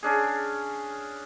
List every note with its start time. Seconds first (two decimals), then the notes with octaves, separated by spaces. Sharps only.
0.03 C#4 D4 G#4